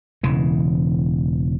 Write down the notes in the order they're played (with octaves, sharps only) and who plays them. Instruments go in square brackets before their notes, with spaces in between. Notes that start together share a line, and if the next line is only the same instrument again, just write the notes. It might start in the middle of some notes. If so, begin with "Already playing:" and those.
[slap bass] E1 C#3 E3